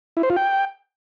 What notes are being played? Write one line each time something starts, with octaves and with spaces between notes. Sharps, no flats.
E4
C5
F4
G5